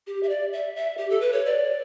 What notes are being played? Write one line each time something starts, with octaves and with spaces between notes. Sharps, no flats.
G4
E5
D5
E5
E5
G4
A4
B4
C#5
D5